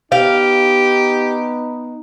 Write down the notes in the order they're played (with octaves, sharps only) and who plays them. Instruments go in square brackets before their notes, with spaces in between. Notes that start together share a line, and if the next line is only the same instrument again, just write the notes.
[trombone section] B3 D#4 [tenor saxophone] G4 [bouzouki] F5